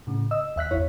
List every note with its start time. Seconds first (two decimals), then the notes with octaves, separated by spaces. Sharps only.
0.07 A2 C#3
0.31 D#5 E6
0.56 D#2 E5 F#6 B6
0.71 G1 E2 E4 C#5